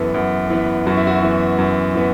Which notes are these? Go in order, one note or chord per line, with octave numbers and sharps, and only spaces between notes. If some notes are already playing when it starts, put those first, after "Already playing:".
Already playing: F#2 E3 B3 A4
F#2
E3 B3
F#2 F#4
E4
F#4
E3 B3
F#2
E3 B3